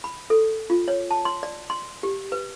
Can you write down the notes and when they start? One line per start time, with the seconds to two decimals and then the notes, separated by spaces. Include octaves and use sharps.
0.04 B5
0.30 A4
0.70 F4
0.88 C#5
1.11 A5
1.25 C6
1.43 D5
1.70 C6
2.03 G4
2.32 B4